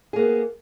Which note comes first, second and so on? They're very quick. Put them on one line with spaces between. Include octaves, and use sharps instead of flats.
G#4 A#3 B3